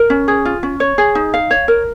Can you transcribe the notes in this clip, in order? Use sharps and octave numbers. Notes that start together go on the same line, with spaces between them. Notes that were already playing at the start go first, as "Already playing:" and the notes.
Already playing: A#4
C#4
G#4
F4
C#4
C#5
G#4
D#4
F5
C#5
A#4